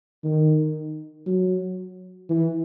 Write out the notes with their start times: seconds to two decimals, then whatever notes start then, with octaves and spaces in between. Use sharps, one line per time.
0.24 D#3
1.27 F#3
2.29 E3